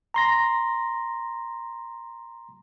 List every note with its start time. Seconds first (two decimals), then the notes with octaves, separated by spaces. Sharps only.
0.14 A#5 C6 A#6